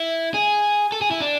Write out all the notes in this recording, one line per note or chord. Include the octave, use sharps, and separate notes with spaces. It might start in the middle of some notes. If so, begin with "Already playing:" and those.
Already playing: E4
G#4
A4
G#4
E4
D4